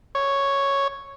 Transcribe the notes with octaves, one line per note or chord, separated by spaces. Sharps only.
C#5